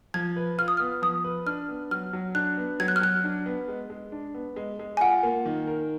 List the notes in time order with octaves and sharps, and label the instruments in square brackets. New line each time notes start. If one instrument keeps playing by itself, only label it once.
[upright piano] F3 [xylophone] G#6
[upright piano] B4
[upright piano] F4 [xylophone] F6
[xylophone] D#6
[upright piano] B3 [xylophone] F6
[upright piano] F3 [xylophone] D#6
[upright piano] B4
[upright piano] D4 [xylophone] F6
[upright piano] B3
[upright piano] F#3 [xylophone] F6
[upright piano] F#3
[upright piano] D4 [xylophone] F#6
[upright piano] B3
[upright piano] F#3 [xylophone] G#6
[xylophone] F#6
F6
[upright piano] F#3 [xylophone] F#6
[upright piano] D4
B3
G#3
G#3
D4
B3
G#3
G#3
[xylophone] G#5
[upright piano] F4 [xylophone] F#5
[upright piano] A#3
D#3
A#4